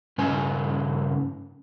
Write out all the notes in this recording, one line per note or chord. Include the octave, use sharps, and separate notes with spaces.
G2 C#3 C#4 B4 G#5